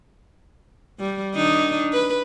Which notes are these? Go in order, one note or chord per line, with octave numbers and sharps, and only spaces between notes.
G3
D#3 D4 D#4
B4